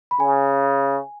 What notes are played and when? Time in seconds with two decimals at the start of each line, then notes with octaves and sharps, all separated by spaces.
0.11 B5
0.20 C#3 G#5